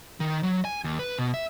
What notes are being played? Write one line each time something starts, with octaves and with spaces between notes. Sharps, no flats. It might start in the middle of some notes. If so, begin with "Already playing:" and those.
D#3
F#3
G#5
D#2
B4
B2
E5